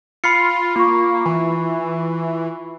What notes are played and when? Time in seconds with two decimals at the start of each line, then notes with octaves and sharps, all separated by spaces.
0.24 F4 B5 F6 C7 C#7
0.76 A#3 F4 C#6
1.25 E3